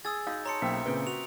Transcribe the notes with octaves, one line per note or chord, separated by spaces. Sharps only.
G#4 D#6 E6 A6
D#4 F#4 F5
C#5 A5 A#5 C6 C#7
B1 A#3 C#4 C5 E5 G5
A#2 C#3 C4 B4 G5
F#4 F7